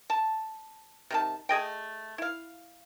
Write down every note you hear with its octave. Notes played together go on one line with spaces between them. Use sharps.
A5
C3 D#3 A5
A3 G#4 D#5 G5
E4 F5